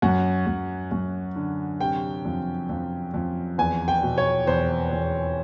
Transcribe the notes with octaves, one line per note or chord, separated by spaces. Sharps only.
F#2 F#5
F#2
F#2
D3
C3 G5
F2
F2
F2
E2 G#5
G5
B2
C#5
E2 C5
E2